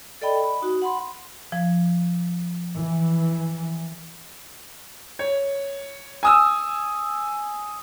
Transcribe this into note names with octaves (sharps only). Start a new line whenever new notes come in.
A4 D5 D#5 G5 B5
B5
D#4 F#4
F#5 B5 C6
F3
E3
C#5
G#5 D#6 E6